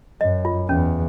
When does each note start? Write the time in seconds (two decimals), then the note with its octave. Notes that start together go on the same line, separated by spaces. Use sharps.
0.21 F#2 D#5
0.45 F4
0.69 E2 C#4